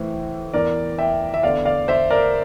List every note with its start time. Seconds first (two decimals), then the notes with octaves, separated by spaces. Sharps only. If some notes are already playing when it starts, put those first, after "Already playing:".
Already playing: A2 E3 C5 E5
0.54 E2 E3 A#4 D5
0.98 E5 G5
1.34 E5
1.43 E2 D3 D5 F5
1.65 D5 F5
1.88 C5 E5
2.10 A#4 D5